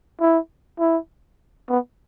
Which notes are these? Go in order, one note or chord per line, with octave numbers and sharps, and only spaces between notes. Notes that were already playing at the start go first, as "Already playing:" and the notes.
E4
E4
B3